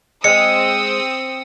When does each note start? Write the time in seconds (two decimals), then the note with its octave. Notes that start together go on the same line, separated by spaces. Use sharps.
0.24 G#3 C4 D#6 E6 C#7